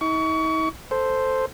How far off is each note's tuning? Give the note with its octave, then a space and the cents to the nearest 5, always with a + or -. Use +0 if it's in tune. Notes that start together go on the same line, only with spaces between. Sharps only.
D#4 +45 C#6 +30
A4 +0 C5 +0